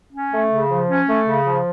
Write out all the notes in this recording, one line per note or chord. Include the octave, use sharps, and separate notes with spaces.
C#4
A3
C#3
F3
C#4
A3
C#3
F3